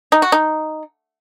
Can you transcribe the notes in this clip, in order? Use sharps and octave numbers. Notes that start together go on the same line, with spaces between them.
D#4
F#4
D#4